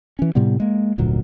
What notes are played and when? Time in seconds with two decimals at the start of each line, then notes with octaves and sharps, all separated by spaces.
0.19 E3 C#4
0.35 A2 C3 G3 B3
0.60 G#3 A#3
0.98 F1 D2 A#2 F#3